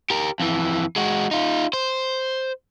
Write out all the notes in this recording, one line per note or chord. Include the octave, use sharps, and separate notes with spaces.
G4 A#4
F2 E3
G#3 F#4
D#4 F4
C5